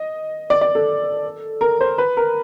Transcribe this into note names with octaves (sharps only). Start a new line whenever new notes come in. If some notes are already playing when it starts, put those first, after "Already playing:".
Already playing: D#5
D5
D5
A4
A#4
C5
B4
A#4